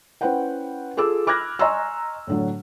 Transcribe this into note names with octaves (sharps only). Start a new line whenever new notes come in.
C#4 E4 B4 C5 F#5 G5
F4 G#4 A4 D6 E6
B5 D6 F6 F#6 G#6 A#6
D#5 G#5 A#5 C6 C#6 E6
A2 D3 F#3